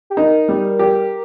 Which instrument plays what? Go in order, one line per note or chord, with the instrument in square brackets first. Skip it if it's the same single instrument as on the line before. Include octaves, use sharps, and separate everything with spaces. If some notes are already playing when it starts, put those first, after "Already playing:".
[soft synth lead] G4
[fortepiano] D#4 [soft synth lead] A#4
[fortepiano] G3
G4